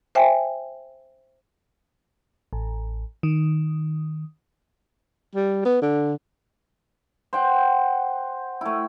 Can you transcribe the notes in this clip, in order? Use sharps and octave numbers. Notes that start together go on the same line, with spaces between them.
C5 E5 G5 G#5
A1
D#3
G3
B3
D3
C5 F#5 G5
A3 E4